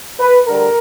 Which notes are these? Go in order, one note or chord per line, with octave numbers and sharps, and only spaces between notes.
B4
D2 D3 G3 A#4